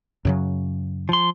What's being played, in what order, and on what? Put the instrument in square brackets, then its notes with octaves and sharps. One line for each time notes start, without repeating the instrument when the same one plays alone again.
[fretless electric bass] F#2 C#3 F#3
[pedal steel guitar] F3 C6